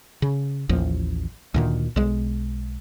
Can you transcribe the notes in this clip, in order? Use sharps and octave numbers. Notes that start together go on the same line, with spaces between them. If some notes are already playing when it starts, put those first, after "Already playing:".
C#3
A1 D#2 F3
D2 A#2 D#3
B1 G#3